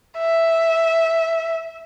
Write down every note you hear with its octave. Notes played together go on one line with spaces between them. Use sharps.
E5